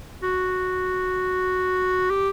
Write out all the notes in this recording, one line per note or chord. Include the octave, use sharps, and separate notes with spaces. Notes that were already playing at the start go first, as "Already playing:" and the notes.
F#4
G4